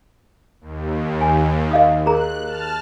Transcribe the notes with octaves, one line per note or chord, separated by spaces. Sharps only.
D#2
G#5
D#5 F5 D#6
G#4 A#4 A#5 F#6
A5 F6